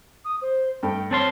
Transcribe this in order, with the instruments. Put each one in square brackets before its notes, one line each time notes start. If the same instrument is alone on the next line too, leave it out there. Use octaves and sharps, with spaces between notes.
[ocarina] D#6
C5
[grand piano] G2 A3 [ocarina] G5
[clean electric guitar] C4 A5 C6 [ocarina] C#5